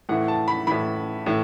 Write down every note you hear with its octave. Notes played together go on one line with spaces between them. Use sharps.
A2 E3 F#5
A5
B5
A2 E3 B5
A2 E3